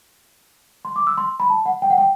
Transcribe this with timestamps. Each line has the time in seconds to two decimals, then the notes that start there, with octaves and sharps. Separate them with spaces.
0.85 C6
0.96 D6
1.07 E6
1.18 C6
1.40 B5
1.50 A5
1.66 F#5
1.82 G5
1.90 F#5
1.98 G5